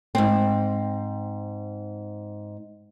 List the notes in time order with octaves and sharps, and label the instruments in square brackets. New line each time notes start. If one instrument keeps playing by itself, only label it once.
[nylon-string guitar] G#2 C4